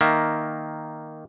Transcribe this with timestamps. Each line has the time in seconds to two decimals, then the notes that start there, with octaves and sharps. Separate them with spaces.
0.01 D#3 A#3 E5